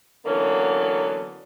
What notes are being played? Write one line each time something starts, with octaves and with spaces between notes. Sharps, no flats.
D3 E3 F#3 A#3 B3 C#4